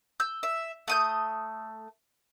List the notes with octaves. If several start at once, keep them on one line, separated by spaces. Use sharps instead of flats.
E6 G6
E5
A3 D#6 G6